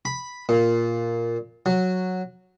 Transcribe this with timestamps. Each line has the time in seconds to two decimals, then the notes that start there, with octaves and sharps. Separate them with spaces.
0.05 B5
0.49 A#2
1.66 F#3